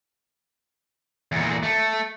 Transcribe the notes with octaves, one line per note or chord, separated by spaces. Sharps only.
E2 A#2
A3